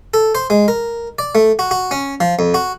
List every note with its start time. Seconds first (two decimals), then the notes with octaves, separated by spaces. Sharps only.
0.14 A4
0.35 C5
0.50 G#3
0.68 A#4
1.19 D5
1.35 A3
1.59 F#4
1.71 F#4
1.91 C#4
2.20 F3
2.39 F2
2.54 F#4